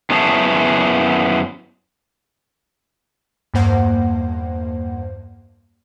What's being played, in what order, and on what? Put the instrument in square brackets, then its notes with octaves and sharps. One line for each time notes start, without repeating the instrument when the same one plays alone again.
[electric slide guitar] F#2 B3 E4 G#4 C#5 A5
[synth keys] E2 G2 A#3 C5 F#5